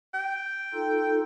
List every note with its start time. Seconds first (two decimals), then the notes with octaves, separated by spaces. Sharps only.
0.14 G5
0.74 D#4 F4 A4